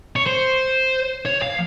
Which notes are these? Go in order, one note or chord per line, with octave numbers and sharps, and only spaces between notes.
C#5
C5
C#5
F5